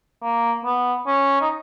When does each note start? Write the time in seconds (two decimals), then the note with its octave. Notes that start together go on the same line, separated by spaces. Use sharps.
0.22 A#3
0.65 B3
1.07 C#4
1.41 D#4